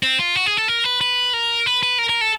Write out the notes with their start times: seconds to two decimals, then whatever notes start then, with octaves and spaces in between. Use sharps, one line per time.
0.03 C4
0.19 F4
0.35 F#4
0.46 G#4
0.57 A4
0.68 A#4
0.84 B4
1.01 B4
1.33 A#4
1.66 B4
1.83 B4
1.98 A#4
2.09 A#4
2.21 A4